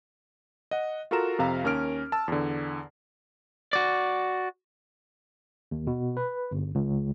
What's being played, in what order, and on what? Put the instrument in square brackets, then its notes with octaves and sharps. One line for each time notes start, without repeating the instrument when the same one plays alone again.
[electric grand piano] D#5 F#5
F4 F#4 A4 A#4 A#5 E7
F2 C3 F5 A#5
D#2 C#4 A#4 F6 D7
A5 E6
E2 D3
[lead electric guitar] F#4 D5
[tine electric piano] D#2
B2
B4
G1
C#2